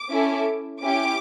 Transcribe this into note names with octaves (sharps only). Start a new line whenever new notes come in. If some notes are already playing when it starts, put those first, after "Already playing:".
Already playing: D6
C#4 E4 A4
C#4 E4 G4 D6